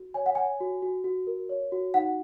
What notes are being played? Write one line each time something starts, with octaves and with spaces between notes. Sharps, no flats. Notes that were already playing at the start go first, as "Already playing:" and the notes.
Already playing: F#4
C#5 G#5
F#5
C#5 G#5
F#4
F#4
F#4
A#4
C#5
F#4
D#4 F#5